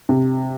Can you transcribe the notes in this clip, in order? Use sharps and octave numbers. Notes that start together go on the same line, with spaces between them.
C3